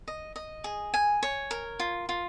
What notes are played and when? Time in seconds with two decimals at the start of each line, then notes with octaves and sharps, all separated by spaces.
0.08 D#5
0.36 D#5
0.64 G#4
0.94 G#5
1.23 C#5
1.51 A#4
1.80 F4
2.09 F4